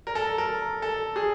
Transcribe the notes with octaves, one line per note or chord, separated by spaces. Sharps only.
A#4
A4
A#4
A4
G#4